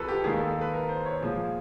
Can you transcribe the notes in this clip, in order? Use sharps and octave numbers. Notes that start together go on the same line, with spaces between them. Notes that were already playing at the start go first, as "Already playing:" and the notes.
Already playing: C2 F3 G#4 A4 B4
G4
D#2 D#3 G#3 G#4
A4
A4
B4
A#4
C5
C#5
A#2 F3 G#3